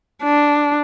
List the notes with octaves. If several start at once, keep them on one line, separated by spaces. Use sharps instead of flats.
D4